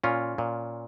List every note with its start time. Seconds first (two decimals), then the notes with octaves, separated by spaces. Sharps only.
0.04 A#2 C#4 F4
0.38 A#2